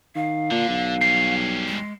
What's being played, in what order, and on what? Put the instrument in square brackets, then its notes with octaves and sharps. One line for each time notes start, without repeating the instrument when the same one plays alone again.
[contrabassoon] D#3 [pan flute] F5
[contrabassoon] A#2 [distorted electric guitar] D3
[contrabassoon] B1
[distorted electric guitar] G2 C#4 [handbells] C7
[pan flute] G#3